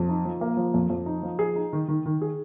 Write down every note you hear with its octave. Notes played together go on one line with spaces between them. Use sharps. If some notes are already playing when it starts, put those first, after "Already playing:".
Already playing: F2
D#4
F3
A#3
F3
F2
F2
D#4
F3
G#4
D#4
D#3
D#3
D#3
G#4